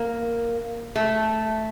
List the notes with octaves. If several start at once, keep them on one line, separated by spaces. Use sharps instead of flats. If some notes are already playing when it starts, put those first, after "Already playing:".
Already playing: A#3
A3